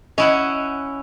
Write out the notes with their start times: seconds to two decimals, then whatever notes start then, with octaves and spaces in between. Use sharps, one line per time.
0.18 C#4 E4 D#5 F#5